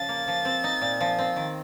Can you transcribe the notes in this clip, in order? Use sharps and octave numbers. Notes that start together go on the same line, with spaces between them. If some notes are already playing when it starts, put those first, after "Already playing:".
Already playing: C#3 F3 A6
A#3
F3
C4
D#4
A#2
F3
C4
D#3